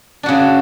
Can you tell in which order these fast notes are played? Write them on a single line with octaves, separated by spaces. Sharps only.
D4 F#4 C#3